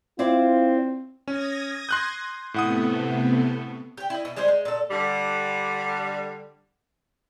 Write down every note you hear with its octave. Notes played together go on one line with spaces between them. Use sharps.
C4 E4 F4 C5 D5
C#4 D#6 G#6 A#6
C6 F#6 G6
A2 C3 A3 B3 F#5 D#6
G4 G5
E4 D#5
B2 E4
G3 G#3 G#4 C5
G#3
A#2 A4
D3 G3